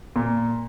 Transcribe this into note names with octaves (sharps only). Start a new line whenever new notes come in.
A#2